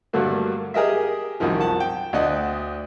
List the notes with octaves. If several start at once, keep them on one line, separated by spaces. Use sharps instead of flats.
G2 D3 F#3 A3 A#3 F#4
G4 G#4 A#4 D#5 E5
C2 F#2 D#3 F3
F#5 A5
G5
D2 D4 D#5 F#5